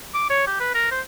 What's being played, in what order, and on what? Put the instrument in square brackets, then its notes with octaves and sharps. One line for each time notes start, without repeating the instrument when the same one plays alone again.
[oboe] D6
C#5
G4
B4
A#4
C5